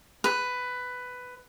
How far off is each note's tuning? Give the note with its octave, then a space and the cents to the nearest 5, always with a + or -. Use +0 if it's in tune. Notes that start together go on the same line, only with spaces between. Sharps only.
B4 +10